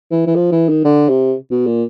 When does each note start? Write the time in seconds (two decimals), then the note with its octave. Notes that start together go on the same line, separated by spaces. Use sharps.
0.11 E3
0.27 E3
0.36 F3
0.52 E3
0.69 D#3
0.84 D3
1.09 C3
1.51 B2
1.67 A#2